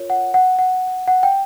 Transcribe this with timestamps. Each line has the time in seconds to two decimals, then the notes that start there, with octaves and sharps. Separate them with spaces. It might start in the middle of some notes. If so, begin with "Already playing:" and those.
Already playing: F4 A#4 C#5
0.10 F#5
0.34 F#5
0.59 F#5
1.08 F#5
1.23 G5